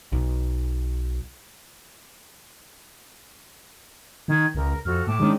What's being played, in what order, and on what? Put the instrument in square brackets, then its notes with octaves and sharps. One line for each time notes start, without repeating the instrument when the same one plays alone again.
[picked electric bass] B1
[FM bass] D#3 [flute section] G#6
[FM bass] C#2 [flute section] A#4
[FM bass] F2 [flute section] F#4 A4 F6
[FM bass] A2 [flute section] G5 A5 D6
[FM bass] D#3 [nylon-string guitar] G#3 C#4 D4